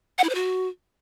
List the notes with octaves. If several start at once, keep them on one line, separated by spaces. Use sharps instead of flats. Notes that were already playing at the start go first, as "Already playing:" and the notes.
F#5
E4
C5
F#4